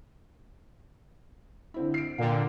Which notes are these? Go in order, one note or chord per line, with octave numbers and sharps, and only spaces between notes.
D3 C4 E4
C7 D7
A#2 D3 F5 G5